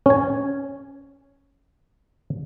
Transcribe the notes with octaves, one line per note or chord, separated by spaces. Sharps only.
C#4 G#5